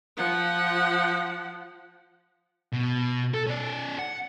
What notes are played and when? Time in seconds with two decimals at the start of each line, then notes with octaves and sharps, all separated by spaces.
0.17 F3 F#5
2.73 B2
3.34 A4
3.47 C#4 D5
3.99 F#5